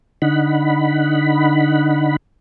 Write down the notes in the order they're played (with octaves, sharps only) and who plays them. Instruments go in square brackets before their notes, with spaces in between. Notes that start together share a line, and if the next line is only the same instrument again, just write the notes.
[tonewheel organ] D3 D#4 F#5 B5